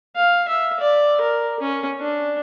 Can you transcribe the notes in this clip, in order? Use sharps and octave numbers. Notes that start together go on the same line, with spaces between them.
F5
E5
D5
A#4
C#4
D4